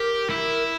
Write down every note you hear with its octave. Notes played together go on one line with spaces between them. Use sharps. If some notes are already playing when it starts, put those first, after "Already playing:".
Already playing: G4 A#4
E4